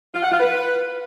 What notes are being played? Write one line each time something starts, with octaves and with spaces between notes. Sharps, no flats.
F4
F#5
F4
B4